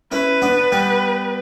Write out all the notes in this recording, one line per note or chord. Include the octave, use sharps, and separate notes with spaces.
C#4 E4 B4
B3 D4
G3 B3